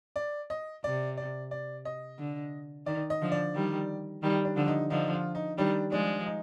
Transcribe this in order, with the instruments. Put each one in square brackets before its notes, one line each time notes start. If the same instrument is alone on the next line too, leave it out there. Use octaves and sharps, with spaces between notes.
[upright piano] D5
D#5
[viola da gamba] C3 [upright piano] D5
[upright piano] D5
D5
D#5
[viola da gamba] D3
[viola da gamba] D#3 [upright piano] D5
[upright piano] D#5
[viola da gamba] D3 F3
[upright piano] D5
[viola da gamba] D#3 G3
D#3 G3
[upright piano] D4
[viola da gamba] D3 F3
[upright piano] D#4
[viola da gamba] D3 F3 [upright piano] D#4
[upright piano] F4
D#4
[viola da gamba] D#3 G3 [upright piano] D4
[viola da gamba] F3 G#3 [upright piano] D4
[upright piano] D#4